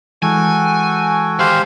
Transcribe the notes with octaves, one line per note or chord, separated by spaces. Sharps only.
E3 G#3 F#4 A4 G5 G#5
D#3 G4 G#4 C5 F5